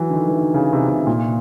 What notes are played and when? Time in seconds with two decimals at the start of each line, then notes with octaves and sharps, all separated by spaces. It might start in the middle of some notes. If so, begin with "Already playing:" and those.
Already playing: E3 F#3
0.10 D3
0.13 D#3
0.28 E3
0.38 D#3
0.54 C#3
0.73 C3
0.89 C3
1.07 A#2